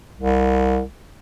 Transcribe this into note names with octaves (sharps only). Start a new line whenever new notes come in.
C2